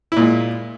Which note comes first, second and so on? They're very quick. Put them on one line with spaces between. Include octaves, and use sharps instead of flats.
E4 A#2 G#3